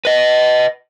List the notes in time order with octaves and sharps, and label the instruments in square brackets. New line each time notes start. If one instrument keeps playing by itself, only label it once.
[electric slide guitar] B4 D#5